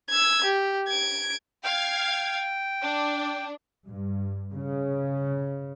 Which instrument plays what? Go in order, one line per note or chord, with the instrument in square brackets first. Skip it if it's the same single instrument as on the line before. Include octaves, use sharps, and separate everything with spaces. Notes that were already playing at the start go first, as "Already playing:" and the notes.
[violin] E6 G#6
G4
G#6 D7
[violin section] F5 G#6 [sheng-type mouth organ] G5
[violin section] D4
[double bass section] G2
C#3